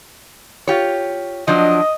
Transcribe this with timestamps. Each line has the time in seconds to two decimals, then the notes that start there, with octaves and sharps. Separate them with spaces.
0.67 F4 G4 C#5
1.48 F3 F#3 D4 D#5